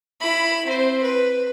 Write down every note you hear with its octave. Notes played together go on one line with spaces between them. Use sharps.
E4 B5
C4 C5
B4